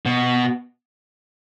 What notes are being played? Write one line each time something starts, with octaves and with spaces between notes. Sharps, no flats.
B2